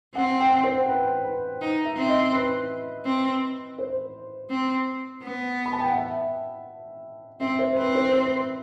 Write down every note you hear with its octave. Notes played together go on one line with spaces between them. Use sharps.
C4 F#5
G5
C5
B4
B4
D#4
E5
C4
D#5
B4
C4
C5
C4
B3
B5
A5
G5
F#5
E5
C4 E5
C5
C4 B4
C5
C5